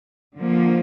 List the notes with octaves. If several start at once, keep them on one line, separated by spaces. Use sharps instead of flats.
D3 F3 A#3